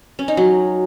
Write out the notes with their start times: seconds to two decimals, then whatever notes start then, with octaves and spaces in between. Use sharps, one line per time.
0.19 C#4
0.28 D#4
0.37 F#3